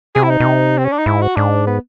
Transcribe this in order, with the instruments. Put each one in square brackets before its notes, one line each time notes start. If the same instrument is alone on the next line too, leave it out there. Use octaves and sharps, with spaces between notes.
[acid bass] C3 [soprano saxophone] G#4
[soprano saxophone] E4
D#4
[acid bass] B2
C3
[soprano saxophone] C4
C#4
D4
D#4
[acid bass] G#2 [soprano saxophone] E4
[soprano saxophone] F#4
[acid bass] G#2 [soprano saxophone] D4
[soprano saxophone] B3